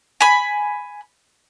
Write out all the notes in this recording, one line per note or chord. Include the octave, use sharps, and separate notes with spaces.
G#5 B5